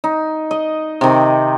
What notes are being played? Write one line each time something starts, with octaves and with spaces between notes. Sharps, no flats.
D#4
D#5
C3 D#3